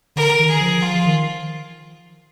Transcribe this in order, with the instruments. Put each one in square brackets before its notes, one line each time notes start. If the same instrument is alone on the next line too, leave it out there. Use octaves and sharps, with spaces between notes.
[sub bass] D3 [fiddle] A#4
[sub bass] D#3
[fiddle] G#4
[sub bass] F3
[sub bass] F3 [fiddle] F4
[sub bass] D#3